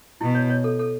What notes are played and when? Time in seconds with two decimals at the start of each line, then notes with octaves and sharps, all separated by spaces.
0.21 B2 E4
0.35 C#5
0.50 C#5
0.64 A4
0.79 A4